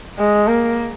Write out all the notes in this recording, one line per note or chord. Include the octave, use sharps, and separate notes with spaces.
G#3
A#3